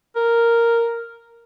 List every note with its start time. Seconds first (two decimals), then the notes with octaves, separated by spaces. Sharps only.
0.16 A#4